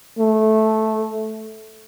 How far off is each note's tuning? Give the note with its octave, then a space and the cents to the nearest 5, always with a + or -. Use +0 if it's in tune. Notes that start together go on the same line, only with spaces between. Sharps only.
A3 -10